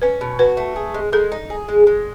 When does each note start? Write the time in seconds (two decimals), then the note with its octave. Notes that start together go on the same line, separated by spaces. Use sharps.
0.02 C#4 B4
0.21 B2
0.39 F#4 B4
0.57 A3
0.76 G#4
0.94 G#3
1.13 G#3 A4
1.32 D#4
1.50 G#4
1.69 G#3
1.87 G#3